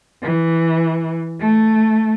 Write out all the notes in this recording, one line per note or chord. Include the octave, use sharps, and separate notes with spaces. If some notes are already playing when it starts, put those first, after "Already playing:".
E3
A3